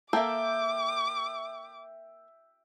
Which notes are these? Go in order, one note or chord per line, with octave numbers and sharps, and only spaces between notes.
A#3 A4 A#4 E5 G5 D6